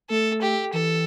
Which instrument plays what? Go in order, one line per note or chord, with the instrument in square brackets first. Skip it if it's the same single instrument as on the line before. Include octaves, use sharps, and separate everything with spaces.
[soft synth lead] A3 [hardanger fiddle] A4
[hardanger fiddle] G4
[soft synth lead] E3 [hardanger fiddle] A4